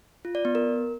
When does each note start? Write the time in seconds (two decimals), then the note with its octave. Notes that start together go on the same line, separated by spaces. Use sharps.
0.25 F4
0.35 D5
0.45 B3
0.55 A#4